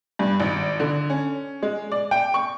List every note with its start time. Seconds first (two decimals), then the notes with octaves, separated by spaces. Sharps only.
0.19 G2
0.40 G#1
0.80 D3
1.10 C#4
1.63 G#3
1.92 D5
2.11 G5
2.34 C#6